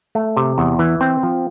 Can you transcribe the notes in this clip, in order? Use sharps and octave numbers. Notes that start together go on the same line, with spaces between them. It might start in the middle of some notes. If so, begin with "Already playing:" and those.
A3
C3
E2
E3
C4
F3